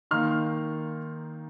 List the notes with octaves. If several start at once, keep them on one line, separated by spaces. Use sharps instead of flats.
D#3 A#3 D#4 C6 F6